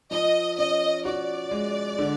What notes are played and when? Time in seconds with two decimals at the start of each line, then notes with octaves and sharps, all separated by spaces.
0.11 F3 D#5
0.58 C#4 D#5
1.05 F#4 D5
1.51 G#3
1.99 D3